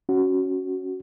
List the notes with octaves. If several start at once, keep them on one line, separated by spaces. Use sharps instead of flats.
C#4 F#4